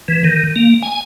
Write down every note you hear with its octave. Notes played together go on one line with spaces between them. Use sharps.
E3
D#3
A#3
G#5